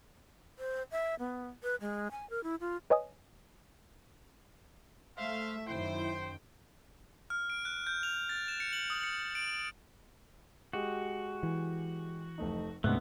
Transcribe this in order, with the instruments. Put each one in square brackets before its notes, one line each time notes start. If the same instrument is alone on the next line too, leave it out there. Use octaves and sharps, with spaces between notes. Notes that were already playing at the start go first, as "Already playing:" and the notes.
[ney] C5
E5
B3
B4
G#3
G#5
A#4
E4
F4
[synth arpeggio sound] B4 C#5 D#5 G#5 D#6
[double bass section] A3 [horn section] C5 F5 [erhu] E5
[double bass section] F#2 D#3 [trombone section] E4 [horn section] C5 [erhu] G5
[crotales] F6
D7
F#6
G6
F7
A6
E7
C#7
F#7
D#6
C#7
D7
[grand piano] G#3 G4 [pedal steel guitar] F#4
[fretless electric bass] E3
[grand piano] F1 A3 D#4
[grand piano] D2 D4 F#6 [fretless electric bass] G#2 C3 [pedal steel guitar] A3 B3